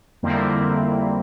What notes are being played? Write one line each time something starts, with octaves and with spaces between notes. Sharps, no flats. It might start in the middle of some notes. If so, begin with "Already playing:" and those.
F2 D3 G3 A#3 C4 E4